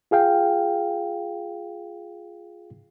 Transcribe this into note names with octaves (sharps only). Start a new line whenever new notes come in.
F4 G#4 F5 G5